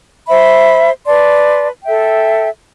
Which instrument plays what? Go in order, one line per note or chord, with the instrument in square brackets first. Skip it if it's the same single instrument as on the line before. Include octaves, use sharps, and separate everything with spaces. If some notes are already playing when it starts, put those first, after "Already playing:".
[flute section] C5 E5 B5
B4 D5 A5 C6
A4 E5 G5